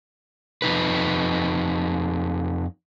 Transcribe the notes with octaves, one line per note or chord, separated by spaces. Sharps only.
F2 B2 D#4 B4